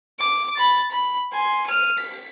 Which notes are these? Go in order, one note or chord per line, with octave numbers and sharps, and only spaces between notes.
D6
B5 A6
B5
G#5 C6
F6 D#7
B6